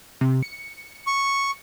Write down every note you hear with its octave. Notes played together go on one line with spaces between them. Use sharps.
C3
C#7
C#6